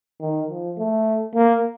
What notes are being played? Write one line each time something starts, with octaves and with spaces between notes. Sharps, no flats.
D#3
F3
A3
A#3